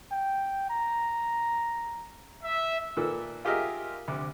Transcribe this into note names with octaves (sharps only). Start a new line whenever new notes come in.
G5
A#5
E5
A#2 D#3 A4 B4 E6
F4 G4 G#4 A#4 D#5 E5
D2 C3 D6